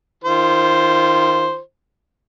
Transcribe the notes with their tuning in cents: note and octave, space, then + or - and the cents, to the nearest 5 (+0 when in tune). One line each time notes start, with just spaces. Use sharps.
D#3 +0 F4 -30 C5 +0